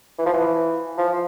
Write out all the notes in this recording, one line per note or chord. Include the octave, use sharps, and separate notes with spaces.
E3
F3
E3
F3